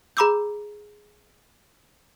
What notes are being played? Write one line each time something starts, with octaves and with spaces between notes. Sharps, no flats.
G#4 A#5 B5 D6 E6 G6